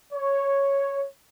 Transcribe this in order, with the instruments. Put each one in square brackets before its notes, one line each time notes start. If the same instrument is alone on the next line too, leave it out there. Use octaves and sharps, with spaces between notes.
[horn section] C#5